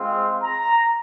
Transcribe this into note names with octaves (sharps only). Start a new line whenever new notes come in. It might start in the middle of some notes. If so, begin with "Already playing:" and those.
Already playing: G#3 C4 F4 C6
A#5